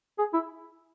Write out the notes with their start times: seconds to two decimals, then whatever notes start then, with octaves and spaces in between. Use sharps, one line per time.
0.18 G#4
0.33 E4